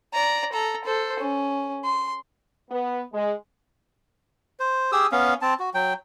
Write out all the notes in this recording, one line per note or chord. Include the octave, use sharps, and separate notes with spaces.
D5 A#5
A4 A#5
A4 C5
C#4
C6
B3
G#3
C5
G4 G#4 D#6 E6
B3 C#4 F5
C4 A5
F#4
F#3 G5